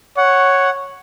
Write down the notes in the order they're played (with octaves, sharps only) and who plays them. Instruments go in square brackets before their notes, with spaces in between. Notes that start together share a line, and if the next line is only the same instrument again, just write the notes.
[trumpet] C#5 [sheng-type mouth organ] F#5